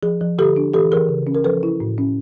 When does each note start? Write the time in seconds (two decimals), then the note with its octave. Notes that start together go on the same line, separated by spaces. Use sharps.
0.03 F3 G#4
0.21 F3
0.38 D3 G4 A4
0.56 D4
0.74 E3 G4 A4
0.92 E3 G#4 A#4
1.09 C#3
1.27 C#4
1.35 A#4
1.44 F3 A4 B4
1.63 E4
1.80 A2
1.98 C#4